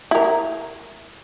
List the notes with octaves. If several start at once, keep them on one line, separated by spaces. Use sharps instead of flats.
E4 A#4